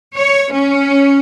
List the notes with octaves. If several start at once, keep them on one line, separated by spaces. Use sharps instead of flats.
C#5
C#4